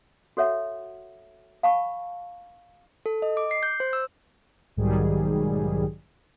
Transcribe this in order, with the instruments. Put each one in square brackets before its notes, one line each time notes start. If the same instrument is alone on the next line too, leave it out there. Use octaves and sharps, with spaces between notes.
[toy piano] F#4 A4 C#5 E5 F#5
F5 A5 B5 C#6
[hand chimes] A4
D#5
D6
C7
G6
C5
E6
[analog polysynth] B1 G#2 D#3 F#3 G3 G#4